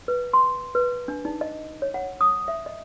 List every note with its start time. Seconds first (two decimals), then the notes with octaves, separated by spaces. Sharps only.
0.08 B4
0.33 C6
0.75 B4
1.08 D4
1.25 D#4
1.41 D#5
1.82 C#5
1.94 F#5
2.21 D#6
2.48 E5
2.66 D#5